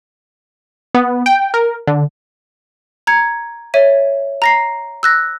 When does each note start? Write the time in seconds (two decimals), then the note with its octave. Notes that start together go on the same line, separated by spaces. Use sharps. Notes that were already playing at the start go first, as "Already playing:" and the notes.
0.95 B3
1.26 G5
1.54 A#4
1.87 D3
3.07 A#5 G#6 C#7
3.74 C#5 E5 D#7
4.42 A#5 A#6 C7
5.03 E6 F#6 A#6